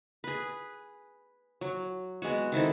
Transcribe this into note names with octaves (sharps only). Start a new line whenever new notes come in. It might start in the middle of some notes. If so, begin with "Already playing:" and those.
G#4 B4
F#3
G#3 B3 F#4
D#3 C4 E4 A4